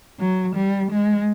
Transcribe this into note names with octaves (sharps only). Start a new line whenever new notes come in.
F#3
G3
G#3